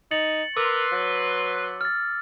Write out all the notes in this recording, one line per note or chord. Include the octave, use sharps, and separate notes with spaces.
D#4 A6 C#7 F#7
A#4 B4 C6 D6 E6
F#3
F6 A6